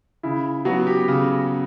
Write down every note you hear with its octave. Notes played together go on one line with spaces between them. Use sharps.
C#3 E4
F#3 B3 F#4
G4
C#3